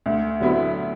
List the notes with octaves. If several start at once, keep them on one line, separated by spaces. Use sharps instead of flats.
D2
D3 F#3 B3 E4